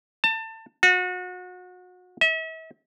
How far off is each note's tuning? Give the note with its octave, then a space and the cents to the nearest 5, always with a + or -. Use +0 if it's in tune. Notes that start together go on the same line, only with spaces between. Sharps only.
A5 +25
F#4 -30
E5 -40